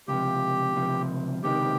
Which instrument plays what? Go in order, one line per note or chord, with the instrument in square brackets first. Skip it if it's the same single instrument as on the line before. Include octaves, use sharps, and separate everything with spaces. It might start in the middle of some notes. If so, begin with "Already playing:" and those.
[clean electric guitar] C#2 C3 F3 [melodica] G4
[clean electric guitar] C#2 C3 F3
[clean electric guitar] C#2 C3 D#3 G#3 [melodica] G4